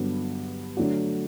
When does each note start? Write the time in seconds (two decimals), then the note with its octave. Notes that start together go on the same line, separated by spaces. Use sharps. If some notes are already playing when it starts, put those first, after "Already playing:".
Already playing: G2 D3 F#3 B3
0.77 D3 F#3 A3 D4 F#4